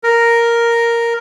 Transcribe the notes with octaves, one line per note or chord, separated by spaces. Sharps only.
A#4